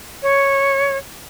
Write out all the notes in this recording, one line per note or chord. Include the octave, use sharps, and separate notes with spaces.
C#5